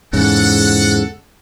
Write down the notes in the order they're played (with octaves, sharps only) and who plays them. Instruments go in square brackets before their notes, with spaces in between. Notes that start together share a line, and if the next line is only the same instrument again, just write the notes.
[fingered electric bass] E2 G#2 C#3 [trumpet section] A4 F#5